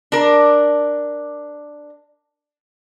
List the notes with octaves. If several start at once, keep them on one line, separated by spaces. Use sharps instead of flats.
D4 A#4